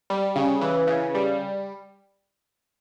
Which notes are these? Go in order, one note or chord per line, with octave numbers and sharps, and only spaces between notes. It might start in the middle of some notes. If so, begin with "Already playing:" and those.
G3
C#3
E3
C#3
G3